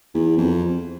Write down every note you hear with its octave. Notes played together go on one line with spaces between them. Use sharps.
E2
F2